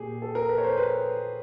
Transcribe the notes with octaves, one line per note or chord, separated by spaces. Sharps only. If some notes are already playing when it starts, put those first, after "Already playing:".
Already playing: A#2 G4 G#4
A4
A#4
B4
C#5
C5
B4